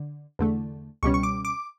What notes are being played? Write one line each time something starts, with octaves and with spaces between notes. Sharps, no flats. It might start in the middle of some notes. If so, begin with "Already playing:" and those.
Already playing: D3
E2 D3 A3
C#2 B2 G3 C#4 C#6
C#6
D6
D6